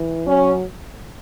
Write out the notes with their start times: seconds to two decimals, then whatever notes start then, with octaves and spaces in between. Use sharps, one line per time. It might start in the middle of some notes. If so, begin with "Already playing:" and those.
Already playing: E3
0.27 F#3 C#4